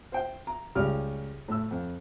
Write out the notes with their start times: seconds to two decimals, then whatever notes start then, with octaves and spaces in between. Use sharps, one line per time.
0.12 C5 G5
0.47 A#5
0.75 C#2 G3 F6
1.48 A2 E6
1.71 F2